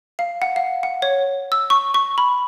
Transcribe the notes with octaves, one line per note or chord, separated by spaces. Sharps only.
F5
F#5
F5
F#5
C#5
E6
C#6
C#6
B5